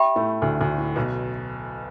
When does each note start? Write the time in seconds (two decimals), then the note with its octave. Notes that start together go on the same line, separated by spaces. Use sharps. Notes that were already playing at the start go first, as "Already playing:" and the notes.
Already playing: G4 E5 G5 B5
0.16 A2 A3
0.42 D2 D3
0.60 D2 D3
0.78 A2
0.96 B1 B2